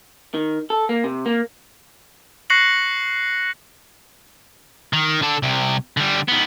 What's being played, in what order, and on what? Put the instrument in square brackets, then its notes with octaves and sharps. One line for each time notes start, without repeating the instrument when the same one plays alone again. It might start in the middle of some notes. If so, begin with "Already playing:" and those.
[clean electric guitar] D#3
A4
A#3
C3
A#3
[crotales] C#6 F#6 A#6 C7 C#7 F#7
[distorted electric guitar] D#3
D3 A4
C2 C3
D3 G3
D#3 B3